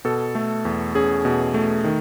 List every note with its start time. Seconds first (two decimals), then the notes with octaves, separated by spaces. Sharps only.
0.05 B2 A4
0.35 A3
0.65 E2
0.95 C#4 G#4
1.25 B2
1.54 A3
1.84 D#3